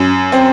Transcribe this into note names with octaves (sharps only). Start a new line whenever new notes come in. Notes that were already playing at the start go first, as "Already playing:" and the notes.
Already playing: F#2
C4